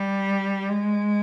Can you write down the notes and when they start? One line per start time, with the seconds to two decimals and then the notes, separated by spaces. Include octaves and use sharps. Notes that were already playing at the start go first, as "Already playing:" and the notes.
Already playing: G3
0.68 G#3